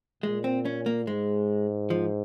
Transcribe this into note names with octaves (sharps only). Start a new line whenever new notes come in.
A#2 G#3
C4
C#4
A#3
G#2 G#3
F3